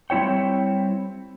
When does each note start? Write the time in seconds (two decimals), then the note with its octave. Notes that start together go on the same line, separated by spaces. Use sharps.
0.10 G3 C4 E4 C#5 G5